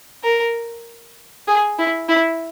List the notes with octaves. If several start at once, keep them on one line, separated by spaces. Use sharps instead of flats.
A#4
G#4
E4
E4